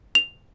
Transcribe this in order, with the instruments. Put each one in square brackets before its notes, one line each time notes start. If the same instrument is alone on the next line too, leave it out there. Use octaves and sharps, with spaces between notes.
[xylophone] F7